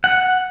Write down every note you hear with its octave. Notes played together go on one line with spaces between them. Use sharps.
F#5